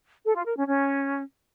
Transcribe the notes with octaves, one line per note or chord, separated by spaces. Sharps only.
A4
F4
A#4
C#4
C#4